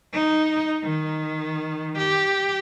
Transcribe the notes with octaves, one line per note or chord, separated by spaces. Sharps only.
D#4
D#3
G4